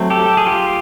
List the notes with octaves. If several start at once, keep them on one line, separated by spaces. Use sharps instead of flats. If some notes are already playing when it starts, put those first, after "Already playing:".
Already playing: F#3 A3 C4
G4 A4
G#4
F4 G4